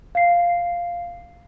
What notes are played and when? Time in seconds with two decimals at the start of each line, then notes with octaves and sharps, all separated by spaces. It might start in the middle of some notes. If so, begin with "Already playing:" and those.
0.15 F5 C7